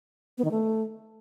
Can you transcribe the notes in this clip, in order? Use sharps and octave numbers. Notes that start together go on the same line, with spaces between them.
B3
D#3
A3